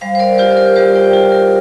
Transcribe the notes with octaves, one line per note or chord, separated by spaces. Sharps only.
G3 C5 F5
C5
A#4 D5
F4 G4 C5
A#4
G3 G4 C5
D5 G5
F4 G4
A#4